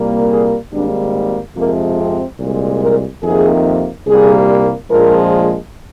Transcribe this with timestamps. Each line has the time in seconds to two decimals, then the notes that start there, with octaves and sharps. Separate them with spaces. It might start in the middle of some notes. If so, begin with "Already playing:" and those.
Already playing: C2 A#2 G3 A#3
0.31 G#4
0.72 G#1 G#2 G3 A#3 D4
1.56 F2 C3 F3 G#3 A#3
1.98 C4
2.40 C2 A#2 G#3
2.81 A#4
3.22 F2 C3 D#3 A#3 G#4
4.06 C2 A#2 G3 A#3 G#4
4.89 A#1 A#2 F3 G#3 A#4